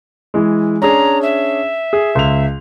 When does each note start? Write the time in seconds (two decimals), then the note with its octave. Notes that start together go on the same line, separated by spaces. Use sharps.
0.34 E3 G#3
0.82 C#4 D4 G#4 A#5
1.22 E5
1.93 G#4
2.15 C#2 F7